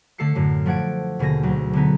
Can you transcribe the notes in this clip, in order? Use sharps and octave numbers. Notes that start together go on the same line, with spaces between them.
D3 A3 A4 C7 C#7
F#2 A2 D3
F3 A3 D4 F#5 G#6 D7
D#2 B2 D3 G#4 A#6
D2 F#3
D3 G#3 B3 D#4